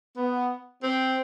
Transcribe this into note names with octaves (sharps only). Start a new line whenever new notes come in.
B3
C4